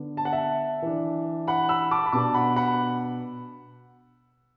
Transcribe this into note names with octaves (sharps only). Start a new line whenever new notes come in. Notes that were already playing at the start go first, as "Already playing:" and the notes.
Already playing: D3 B3 D4
A5
F#5
E5 A5
E3 D4
F#5 B5
B5 E6
A5 D6
B5
B2 B3 D4 A5 D6
F#5 B5
F#5 B5